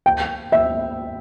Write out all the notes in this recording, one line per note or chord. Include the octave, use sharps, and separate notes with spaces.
G5
E5